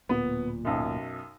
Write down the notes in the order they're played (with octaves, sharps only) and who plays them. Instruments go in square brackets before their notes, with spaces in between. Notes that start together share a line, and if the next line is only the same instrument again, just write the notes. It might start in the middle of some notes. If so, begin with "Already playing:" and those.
[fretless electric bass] D1 A#2 [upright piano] B3
[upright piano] B1 F#2